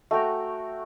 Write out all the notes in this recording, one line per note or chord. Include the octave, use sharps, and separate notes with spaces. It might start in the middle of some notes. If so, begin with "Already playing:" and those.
A3 F#4 G5 A#5